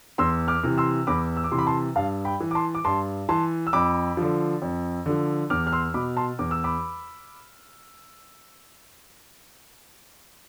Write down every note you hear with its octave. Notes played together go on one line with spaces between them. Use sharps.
E2 C6 E6
D6 F6
C3 E3
C6 E6
E2 B5 D6
E6
D6
C3 E3 C6
B5 D6
A5 C6
G2 F5 A5
G5 B5
E3
D6
A5 C6
D6
G2 A5 C6
E3 A5 C6
E6
F2 B5 D6
D3 F3
F2
D3 F3
E2 D6 F6
F6
C6 E6
B2 B5 D6
A5 C6
E2 D6
E6
B5 D6